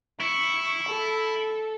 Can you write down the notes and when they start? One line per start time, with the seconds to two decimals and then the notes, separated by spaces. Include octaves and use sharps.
0.21 E4 C#6
0.89 A4